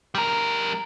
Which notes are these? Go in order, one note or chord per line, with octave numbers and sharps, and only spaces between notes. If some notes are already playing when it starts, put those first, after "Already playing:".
G3 A#4